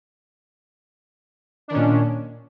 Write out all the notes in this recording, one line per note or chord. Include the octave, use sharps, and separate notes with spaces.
A#2 D#3 C#4 D4